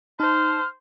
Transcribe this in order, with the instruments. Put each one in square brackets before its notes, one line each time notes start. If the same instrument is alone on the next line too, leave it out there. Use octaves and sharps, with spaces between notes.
[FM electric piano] D#4 A5 [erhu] C5 [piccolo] F6